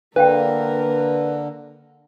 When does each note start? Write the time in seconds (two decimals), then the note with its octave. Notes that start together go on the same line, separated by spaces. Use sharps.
0.16 D3 A#3 D4 A#4 B4 F5 G5